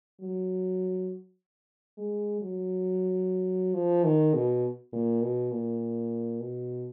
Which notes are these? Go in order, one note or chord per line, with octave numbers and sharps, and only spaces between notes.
F#3
G#3
F#3
F3
D#3
B2
A#2
B2
A#2
B2